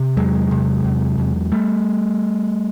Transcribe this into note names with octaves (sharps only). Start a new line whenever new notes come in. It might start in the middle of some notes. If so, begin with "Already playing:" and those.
Already playing: C3
E2 F#3 G#3
C3
E2
E2
G3 A3